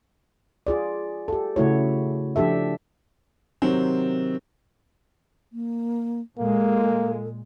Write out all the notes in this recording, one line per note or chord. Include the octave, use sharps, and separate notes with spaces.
F4 G#4 D5
G4 A4
C#3 A3 E4 F#4 C#5
F3 D4 G4 A4 E5
C3 D#3 F#3 C4
A#3
A#2 G#3 A#3 A4